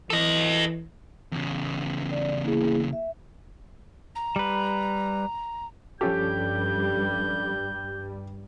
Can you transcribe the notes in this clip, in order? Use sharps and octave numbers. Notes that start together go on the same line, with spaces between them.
E3 A4 D#5
E2 C#3
D5
A#3 E4 G#4
E5
A#5
G3 B4
G2 F3 G3 C#4 G4 A4 G6